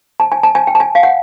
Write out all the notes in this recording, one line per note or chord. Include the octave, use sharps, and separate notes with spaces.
A5
G#5
A5
G#5
G5
A5
G#5
F5
F#5